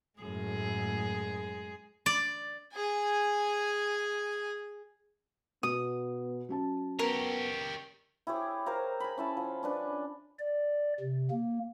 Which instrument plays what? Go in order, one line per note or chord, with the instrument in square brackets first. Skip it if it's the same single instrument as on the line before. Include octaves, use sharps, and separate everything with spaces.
[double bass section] F#2 A2 [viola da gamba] G#3 G#4
[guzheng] D5
[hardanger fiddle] G#4 G#5
[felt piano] B2 [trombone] B3 [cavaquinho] D#6
[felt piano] F#3 C#4 A5
[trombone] B3 [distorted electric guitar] G4 C#5 [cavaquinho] A#4
[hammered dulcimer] E4 G4 G#4 C#5
A#4 C5 F5 A#5
G#5 B5
C#4 E4 A5
F3
C#4 D4 B4
[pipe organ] D5
C3
A#3